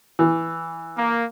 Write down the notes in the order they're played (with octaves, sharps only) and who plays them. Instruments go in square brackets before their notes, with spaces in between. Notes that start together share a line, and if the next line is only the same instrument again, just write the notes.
[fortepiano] E3
[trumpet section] A#3